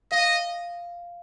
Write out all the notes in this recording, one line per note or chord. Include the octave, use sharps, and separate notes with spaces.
D#5 F5